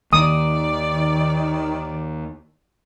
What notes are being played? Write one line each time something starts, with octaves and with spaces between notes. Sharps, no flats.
D#2 D#3 D5 D#6